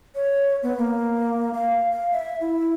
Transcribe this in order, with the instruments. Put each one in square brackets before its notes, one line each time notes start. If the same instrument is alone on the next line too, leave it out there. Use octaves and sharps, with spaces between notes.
[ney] C#5
B3
A#3
F5
F5
E5
E4